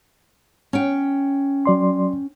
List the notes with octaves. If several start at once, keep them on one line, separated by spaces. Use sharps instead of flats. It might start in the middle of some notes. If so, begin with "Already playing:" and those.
C#4 G5
F#3 D5 C6